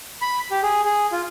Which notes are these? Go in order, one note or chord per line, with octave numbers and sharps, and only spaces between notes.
B5
G4
G#4
G#4
F4